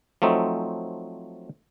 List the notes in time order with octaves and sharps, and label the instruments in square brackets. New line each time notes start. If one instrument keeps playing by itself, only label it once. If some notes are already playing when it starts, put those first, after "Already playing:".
[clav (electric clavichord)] F3 F#3 A3 C4 D#4